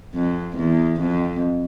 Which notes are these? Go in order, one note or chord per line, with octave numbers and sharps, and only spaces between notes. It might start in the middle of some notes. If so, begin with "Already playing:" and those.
F2
E2
F2